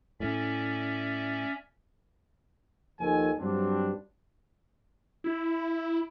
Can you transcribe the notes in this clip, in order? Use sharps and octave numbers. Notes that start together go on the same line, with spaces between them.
A2 C#4 D5 E5
D#2 D#3 F3 A4 G#5
G2 F#3 G3 C4 D4
E4